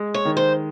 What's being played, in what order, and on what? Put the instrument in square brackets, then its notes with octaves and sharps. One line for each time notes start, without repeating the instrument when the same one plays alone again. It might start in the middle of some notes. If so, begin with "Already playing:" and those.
Already playing: [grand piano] G#3
[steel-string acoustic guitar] C#5
[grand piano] D#3
[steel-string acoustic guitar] C5